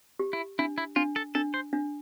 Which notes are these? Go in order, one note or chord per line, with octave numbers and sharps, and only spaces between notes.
G4
E4
D4 E4
E4
D4 F4
A4
D4 A4
C5
D4